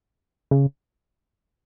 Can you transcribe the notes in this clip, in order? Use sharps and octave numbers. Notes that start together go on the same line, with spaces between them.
C#3